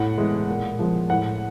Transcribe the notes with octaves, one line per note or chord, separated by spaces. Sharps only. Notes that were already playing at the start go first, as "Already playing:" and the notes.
Already playing: A2 F#5
E3 G#3
A#2
F3 G#3
A2 F#5